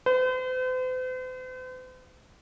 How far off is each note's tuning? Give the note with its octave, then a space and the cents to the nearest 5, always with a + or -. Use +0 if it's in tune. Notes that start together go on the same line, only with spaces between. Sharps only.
C5 -45